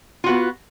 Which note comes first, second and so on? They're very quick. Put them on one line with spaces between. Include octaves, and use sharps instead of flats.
F4 F#4 B3